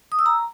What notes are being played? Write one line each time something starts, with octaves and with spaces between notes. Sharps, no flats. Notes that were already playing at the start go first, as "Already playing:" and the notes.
D#6
E6
A#5